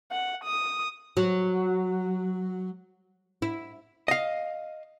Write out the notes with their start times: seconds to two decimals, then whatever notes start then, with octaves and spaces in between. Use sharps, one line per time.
0.12 F#5
0.44 D#6
1.17 F#3
3.42 E4
4.08 D#5 F5